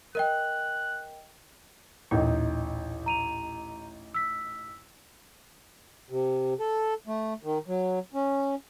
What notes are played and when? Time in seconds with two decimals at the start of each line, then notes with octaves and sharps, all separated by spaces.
0.15 A#4 D#5 G5 F#6
2.11 A1 D#2 A#2 D#4
3.06 A#5 D#7 F7
4.14 E6 B6
6.10 C3
6.60 A4
7.07 A3
7.43 D#3
7.68 F#3
8.14 C#4